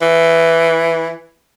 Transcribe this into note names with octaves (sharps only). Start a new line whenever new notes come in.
E3